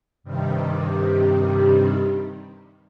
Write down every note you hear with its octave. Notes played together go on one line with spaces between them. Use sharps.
G2 C3 D#3 G3